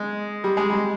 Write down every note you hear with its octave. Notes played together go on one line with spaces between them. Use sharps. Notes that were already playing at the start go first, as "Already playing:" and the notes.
Already playing: G#3
G3
G#3
G3